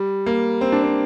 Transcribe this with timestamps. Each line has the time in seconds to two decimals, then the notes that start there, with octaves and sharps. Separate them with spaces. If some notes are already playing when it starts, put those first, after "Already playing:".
Already playing: G3
0.26 A#3
0.61 C4
0.72 D4
0.83 C4